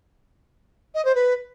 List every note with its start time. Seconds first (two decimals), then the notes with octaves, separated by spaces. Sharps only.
0.95 D#5
1.05 C5
1.15 B4